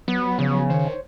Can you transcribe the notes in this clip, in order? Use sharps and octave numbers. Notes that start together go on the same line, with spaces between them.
F#3 B3
C#3 F3 B3 C#5
D#3 C5 C#5